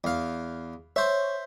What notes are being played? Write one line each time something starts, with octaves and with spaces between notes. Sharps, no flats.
E2 F5
C5 C#5 E5